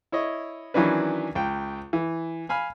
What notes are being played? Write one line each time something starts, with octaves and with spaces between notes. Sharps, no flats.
E4 C#5 D#5
D#3 E3 F#3 C#4 D4 B4
C#2 G5
E3
F5 G#5 B5 F6